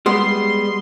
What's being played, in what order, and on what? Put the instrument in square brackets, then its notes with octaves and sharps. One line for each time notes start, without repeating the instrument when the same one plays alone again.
[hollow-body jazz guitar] G3 G#3 B3 [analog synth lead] C6